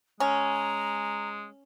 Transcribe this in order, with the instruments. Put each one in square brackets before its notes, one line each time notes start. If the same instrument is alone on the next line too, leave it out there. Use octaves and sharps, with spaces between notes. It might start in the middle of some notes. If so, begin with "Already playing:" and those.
[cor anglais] G#3 [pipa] C#4 [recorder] A#5